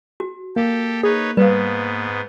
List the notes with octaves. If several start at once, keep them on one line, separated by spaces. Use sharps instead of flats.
F#4
A#3 G4 A4
D#4 G#4 B4 C#5
G#2 G3 B3 B4 F5